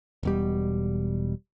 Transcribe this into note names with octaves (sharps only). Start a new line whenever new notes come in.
E1 B2 G3